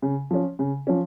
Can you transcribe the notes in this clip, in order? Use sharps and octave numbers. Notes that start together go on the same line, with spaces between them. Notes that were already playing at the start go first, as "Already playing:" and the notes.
C#3
F3 C#4
C#3
F3 C#4